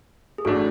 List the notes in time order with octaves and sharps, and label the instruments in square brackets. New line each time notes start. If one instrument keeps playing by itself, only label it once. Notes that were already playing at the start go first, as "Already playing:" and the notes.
[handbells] G#4
[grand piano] A1 A2 F#3 A3 D4 [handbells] F#4 A4